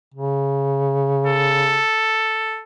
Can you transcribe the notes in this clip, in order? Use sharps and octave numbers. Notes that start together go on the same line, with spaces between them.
C#3
A4